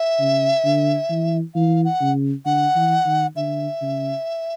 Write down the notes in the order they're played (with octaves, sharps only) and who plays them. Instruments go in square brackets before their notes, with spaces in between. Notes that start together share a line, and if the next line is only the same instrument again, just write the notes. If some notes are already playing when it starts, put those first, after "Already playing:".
Already playing: [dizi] E5
[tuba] C#3
D3
E3
[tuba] E3 [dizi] F5
[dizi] F#5
[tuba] C#3
[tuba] D3 [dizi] F#5
[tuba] E3
D#3
[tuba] D3 [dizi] E5
[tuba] C#3